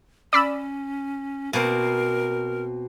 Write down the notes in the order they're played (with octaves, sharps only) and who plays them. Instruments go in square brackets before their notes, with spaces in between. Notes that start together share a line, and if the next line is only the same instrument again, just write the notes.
[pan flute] C#4 [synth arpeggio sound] D5 B5 E6
[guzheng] B2 A#3 C4 [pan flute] A#4